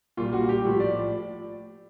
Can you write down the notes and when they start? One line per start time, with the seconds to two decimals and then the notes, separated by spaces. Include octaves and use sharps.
0.17 A#2 G3 F4
0.33 F#4
0.49 G4
0.65 A2 F3
0.80 D5